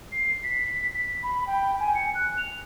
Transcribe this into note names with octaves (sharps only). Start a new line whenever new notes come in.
C7
B6
B6
B5
G5
G#5
C#7
F#6
F7